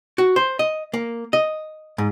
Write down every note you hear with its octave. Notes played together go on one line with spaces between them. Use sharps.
F#4
C5
D#5
A#3
D#5
G#2